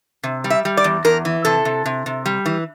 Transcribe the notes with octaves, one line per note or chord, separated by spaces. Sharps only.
C3
G3
E5
G3
D5
E2
E2 A#4
E3
C3 A4
C3
C3
C3
G3
E3